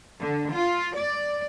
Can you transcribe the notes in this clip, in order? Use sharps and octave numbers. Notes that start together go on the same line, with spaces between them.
D3
F4
D5